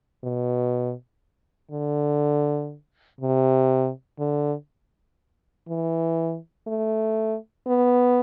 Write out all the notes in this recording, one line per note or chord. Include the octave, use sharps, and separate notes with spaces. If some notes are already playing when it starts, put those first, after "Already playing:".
B2
D3
C3
D3
E3
A3
B3